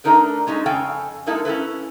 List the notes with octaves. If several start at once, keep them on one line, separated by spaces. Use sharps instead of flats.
A3 D4 D#4 A#4 B4
G#3 C#4 D#4 G4 A4
F2 C#3 A4 F5 G5 G#5
G#3 A#3 D#4 E4 A4 A5
C#4 E4 A4 B4